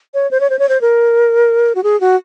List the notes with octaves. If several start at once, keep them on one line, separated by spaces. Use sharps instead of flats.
C#5
C5
C#5
C5
C#5
C5
A#4
F#4
G#4
F#4